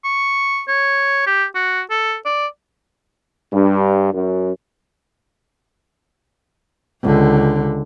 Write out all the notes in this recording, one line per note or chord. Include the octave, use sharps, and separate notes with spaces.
C#6
C#5
G4
F#4
A4
D5
G2
F#2
C#2 D3